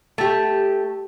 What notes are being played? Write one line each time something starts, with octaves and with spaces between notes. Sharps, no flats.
A3 G4